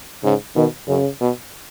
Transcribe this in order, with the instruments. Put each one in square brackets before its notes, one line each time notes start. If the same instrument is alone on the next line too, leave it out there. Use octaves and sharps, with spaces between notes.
[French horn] G#2 [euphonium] C#3
[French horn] B2 [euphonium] D#3
[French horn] F#2 [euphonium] C#3
[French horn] B2